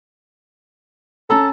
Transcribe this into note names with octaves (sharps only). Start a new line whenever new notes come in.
C#4 A4 A5 A#5